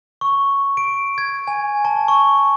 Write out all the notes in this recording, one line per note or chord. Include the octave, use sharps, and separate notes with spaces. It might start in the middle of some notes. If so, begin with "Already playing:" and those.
C#6
D7
G#6
G#5
A5
C#6